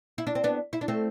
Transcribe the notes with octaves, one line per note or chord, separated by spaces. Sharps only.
E4
D4
C4
B3 D4
E4
D4
A3 C4